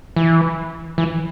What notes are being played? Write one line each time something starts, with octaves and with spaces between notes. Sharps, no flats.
E3
E3